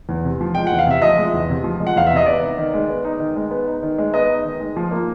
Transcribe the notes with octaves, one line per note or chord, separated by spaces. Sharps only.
E2
C3
F3
G#3 G5
E2 F#5
F5
C3 E5
F3 D#5
G#3
E2
C3
F3
G#3
F#5
E2 F5
E5
C3 D#5
B3 D5
D#4
D#3
G#3
B3
D#4
D#3
G#3
B3
D#4
D#3
G#3
B3 D#5
D#4
D#3
G#3
F3
A#3